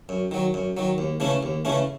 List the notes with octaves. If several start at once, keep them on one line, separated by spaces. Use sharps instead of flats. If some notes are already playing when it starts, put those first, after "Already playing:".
F#2
D#3 F#3
F#2
D#3 F#3
D#2
C#3 E3 A3 C#4
D#2
C#3 E3 A3 C#4